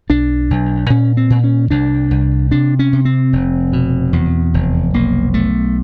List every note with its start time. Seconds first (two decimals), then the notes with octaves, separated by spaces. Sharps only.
0.09 B1 D4
0.50 B1
0.90 A#2 C#4
1.17 C4
1.30 A#2
1.44 C#4
1.70 C2 D4
2.11 C2
2.51 C3 D4
2.79 C#4
2.93 C3
3.05 C4
3.33 F1
3.73 B2
4.13 E2
4.54 F1
4.94 B1 A#3
5.34 B1 A3